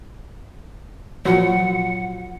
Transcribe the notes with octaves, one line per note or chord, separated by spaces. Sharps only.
A#2 F3 F#3 F4 F#4 C#5 F#5